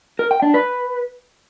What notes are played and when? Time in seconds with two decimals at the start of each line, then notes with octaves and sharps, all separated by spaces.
0.19 A#4
0.31 G5
0.42 D4
0.54 B4